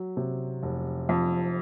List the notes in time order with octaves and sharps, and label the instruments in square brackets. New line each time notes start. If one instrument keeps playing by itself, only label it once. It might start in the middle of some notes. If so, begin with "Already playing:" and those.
Already playing: [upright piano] F#3
C3
F1
F2